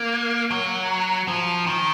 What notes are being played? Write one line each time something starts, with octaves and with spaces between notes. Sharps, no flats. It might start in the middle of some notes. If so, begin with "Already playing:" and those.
Already playing: A#3
F#3
F3
D#3